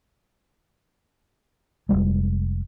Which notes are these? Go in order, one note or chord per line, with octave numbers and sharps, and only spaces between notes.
F1 E2 G3 G#3